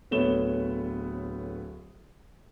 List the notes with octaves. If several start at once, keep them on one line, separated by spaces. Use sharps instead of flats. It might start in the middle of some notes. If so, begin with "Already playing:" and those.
D1 A3 B3 C#5 E7 G7